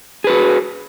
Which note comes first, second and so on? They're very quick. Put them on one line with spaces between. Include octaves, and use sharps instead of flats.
G#4 B4 F#4